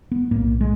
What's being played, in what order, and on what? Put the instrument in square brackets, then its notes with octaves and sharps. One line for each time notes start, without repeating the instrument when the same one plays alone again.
[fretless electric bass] B3
B1 A2 A#3
G#3